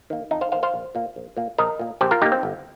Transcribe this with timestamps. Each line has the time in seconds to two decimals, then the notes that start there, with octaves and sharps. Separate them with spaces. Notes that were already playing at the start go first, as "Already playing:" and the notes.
0.10 D#3 A#3
0.31 F2 D#4
0.41 C5 F5
0.52 D#3 C5 F5
0.56 A#3
0.63 C5 F5
0.74 A#1
0.95 A#2 A#3
1.16 A#1
1.37 A#2 A#3
1.58 A#1 A#4 D#5
1.79 A#2 A#3
2.01 A#1 G4 C5
2.11 F4 A#4
2.22 A#2 A#3 D#4 G4
2.32 C4
2.43 G1